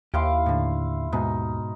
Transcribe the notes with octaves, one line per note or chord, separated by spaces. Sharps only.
D#2 E4 G4 F5 C6
A2 D3
G#2 B2 D#4